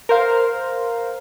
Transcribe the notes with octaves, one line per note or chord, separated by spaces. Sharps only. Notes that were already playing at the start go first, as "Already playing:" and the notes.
A#4 C5 F5